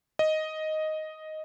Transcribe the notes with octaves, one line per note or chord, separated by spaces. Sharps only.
D#5